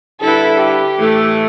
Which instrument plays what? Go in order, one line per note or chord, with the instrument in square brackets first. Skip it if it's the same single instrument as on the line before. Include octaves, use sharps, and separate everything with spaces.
[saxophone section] D3 G3 E4 B4 [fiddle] A4
[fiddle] G4
[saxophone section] A2 E3 A3